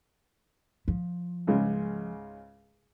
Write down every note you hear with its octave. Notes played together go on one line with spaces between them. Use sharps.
F3
C#2 G#2 C#3